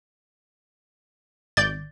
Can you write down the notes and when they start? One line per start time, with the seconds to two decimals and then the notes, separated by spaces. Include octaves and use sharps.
1.57 G#1 D5 G6 A6